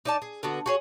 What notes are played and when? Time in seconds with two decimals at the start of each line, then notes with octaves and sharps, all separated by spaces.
0.05 D#4 D5 A5
0.22 G#4
0.43 D3 B3 F#4
0.66 F#4 G#4 C#5